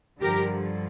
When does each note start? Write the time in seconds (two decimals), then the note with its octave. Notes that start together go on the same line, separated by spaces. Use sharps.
0.20 G2 D3 F3 G4 A#4